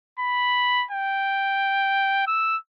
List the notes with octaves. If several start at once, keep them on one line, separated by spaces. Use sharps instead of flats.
B5
G5
E6